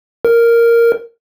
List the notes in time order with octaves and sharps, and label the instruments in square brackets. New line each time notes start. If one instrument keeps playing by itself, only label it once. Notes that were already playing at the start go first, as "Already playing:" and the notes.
[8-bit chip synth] A#4